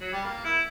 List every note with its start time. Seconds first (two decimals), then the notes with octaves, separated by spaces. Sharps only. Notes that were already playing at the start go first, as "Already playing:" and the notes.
0.01 F#3
0.13 G3
0.25 A#3
0.44 E4